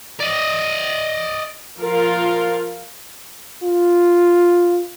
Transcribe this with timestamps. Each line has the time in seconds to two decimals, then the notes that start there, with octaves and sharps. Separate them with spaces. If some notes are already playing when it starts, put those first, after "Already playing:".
0.20 D5 D#5
1.80 F3 F4 A#4 F5
3.63 F4